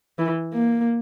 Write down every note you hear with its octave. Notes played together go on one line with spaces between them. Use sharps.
E3
A#3